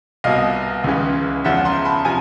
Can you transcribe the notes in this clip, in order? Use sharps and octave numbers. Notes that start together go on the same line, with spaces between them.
C2 B2 D#5 F5
C#2 C#3 E3
E2 C#3 F3 E5 F#5
A#5 C6
A5 B5
C3 F3 G#5 A#5